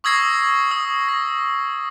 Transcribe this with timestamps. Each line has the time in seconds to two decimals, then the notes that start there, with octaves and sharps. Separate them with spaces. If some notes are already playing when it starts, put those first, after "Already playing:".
0.04 C#6 D#6 E6 G#6 A#6 C7
0.71 D#6
1.09 A#6